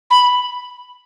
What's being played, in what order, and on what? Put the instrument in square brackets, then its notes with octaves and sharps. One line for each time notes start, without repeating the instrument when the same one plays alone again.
[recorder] B5